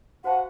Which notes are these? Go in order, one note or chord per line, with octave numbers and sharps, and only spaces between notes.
F#4 C5 F5 F#5 A5 C#6